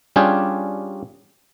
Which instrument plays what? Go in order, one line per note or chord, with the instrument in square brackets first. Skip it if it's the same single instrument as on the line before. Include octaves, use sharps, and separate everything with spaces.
[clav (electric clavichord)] G3 C#4 D4 F4 G4 G#4